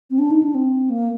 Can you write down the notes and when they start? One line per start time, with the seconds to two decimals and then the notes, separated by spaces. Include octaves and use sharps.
0.11 C4
0.19 D4
0.31 D#4
0.43 D4
0.55 C4
0.90 A#3